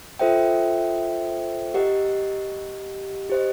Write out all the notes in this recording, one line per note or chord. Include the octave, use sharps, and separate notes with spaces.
F4 A4 C5 E5 G5
G4 A#4 D#5 F#5
G4 C5 D#5